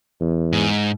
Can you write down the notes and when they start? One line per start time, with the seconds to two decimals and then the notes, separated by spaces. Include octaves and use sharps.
0.21 E2
0.53 G#2